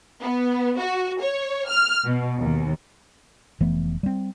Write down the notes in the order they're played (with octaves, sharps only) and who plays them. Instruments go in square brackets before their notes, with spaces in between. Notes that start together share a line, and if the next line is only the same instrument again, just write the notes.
[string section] B3
F#4
C#5
F6
B2
D#2
[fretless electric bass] F1 E3 A3 B3
G3 C4